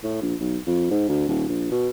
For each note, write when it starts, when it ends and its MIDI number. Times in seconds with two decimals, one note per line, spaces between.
0.04 0.18 45
0.21 0.34 34
0.40 0.57 35
0.67 0.88 41
0.91 1.08 44
1.09 1.25 38
1.28 1.46 27
1.48 1.71 34
1.71 1.89 47